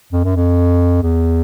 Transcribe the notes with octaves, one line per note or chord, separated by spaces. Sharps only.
F2
F#2
F2
E2